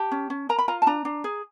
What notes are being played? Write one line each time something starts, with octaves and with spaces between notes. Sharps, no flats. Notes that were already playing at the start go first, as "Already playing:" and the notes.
Already playing: G4 A5
C#4
C#4
A#4 A#5
B5
F4 A#5
A5
D4 A#5
D4
G#4